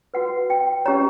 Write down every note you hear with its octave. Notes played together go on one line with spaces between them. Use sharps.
F#4 B4 F#5
G5
C#4 G4 C#5 A#5